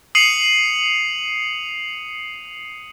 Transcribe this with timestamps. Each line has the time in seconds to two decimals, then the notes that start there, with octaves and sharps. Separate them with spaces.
0.15 D#6 C7 C#7 D#7 F7 F#7